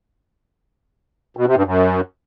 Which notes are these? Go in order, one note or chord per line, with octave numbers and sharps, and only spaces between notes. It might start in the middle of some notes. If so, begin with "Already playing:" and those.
B2
C3
G2
F#2